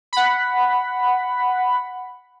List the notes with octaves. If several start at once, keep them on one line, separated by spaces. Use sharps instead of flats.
F#5 B5